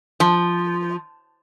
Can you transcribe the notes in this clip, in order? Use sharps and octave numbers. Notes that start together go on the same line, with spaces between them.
F3